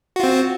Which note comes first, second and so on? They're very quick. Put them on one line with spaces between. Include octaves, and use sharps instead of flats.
F#4 F4 C4